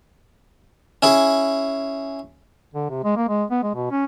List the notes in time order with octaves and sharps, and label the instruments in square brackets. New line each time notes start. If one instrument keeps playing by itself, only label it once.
[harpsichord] C#4 E4 G#4
[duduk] D3
C3
G#3
A#3
G#3
B3
G#3
B2
C#4